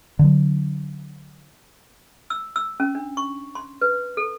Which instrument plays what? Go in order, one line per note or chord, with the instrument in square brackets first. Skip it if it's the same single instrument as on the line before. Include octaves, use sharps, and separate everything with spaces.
[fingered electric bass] D3 F#3
[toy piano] E6
E6
C#4
D4
C#6
C6
B4
A4